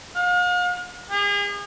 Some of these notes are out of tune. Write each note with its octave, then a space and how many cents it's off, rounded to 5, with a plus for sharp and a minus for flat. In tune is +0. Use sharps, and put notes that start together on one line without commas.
F5 +40
G#4 -40